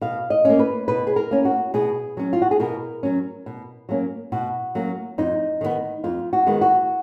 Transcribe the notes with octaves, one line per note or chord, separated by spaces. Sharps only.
B2 F5
D#5
A#3 C#4
B4
B2 B4
G#4
A#4
A#3 C#4
F#4
B2 G#4
F#3 C#4
F4
F#4
G#4
B2 A#4
F#3 C#4
B2
F#3 A#3 C#4
B2 F#4
F#3 A#3 C#4
F2 D#4
D#3 G#3 B3
F2 F4
F#4
D#3 G#3 B3
F#4